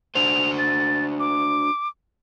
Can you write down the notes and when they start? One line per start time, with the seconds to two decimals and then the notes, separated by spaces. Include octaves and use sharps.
0.15 D4 F#4 C5 F7
0.58 A6
1.20 D6